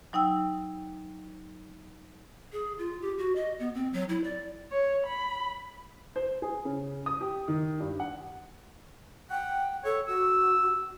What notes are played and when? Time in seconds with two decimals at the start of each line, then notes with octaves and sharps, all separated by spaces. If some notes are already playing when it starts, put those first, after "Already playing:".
0.13 F#3 D#4 G5 E6
2.52 G#4
2.78 F4
3.01 G4
3.18 F#4
3.35 D#5
3.59 B3
3.75 C4
3.93 F#3
4.09 E4
4.24 D5
4.71 C#5
5.06 B5
6.16 C5
6.42 G#4
6.65 C#3
7.06 D#6
7.21 G4
7.48 D#3
7.80 G2
8.00 F#5
9.30 F#5 G5
9.84 A4 C#5
10.08 F#4 E6